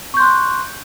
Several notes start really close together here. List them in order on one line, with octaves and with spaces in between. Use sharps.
C#6 G6 C6 F#6